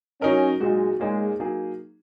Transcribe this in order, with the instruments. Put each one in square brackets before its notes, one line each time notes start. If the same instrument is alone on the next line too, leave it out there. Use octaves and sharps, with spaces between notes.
[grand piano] F#3 D#4 A#4 D#5 [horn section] C#4
[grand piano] A#2 F#3 D#4 F#4 [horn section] G#3
[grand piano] A#2 A#3 D#4 G#4 C#5 [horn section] G#3
[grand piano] F#3 A#3 D#4 G#4